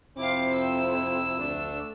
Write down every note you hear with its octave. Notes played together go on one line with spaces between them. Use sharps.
F2 C3 C4 E4 F5 D6
E6
D2 A3 D4 A4